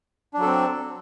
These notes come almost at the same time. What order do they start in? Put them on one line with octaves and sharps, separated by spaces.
D4 F#3 A4 C4